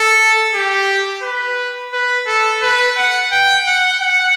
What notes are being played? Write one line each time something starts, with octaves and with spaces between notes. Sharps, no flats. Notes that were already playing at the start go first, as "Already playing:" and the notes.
Already playing: A4
G4
B4
B4
A4
B4
F#5
G5
F#5
F#5